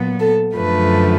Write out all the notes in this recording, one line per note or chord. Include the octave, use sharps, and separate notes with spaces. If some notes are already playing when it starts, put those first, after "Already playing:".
Already playing: A#2 F#3 B3
A4
F#2 D3 F3 A3 B4